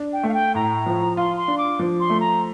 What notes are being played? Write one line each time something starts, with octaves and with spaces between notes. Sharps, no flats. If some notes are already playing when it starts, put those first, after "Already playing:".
Already playing: D4
G5
A3
F5
G5
A2 A#5
F3
F4 C6
C6
D4
D6
F3
C6
A3
A#5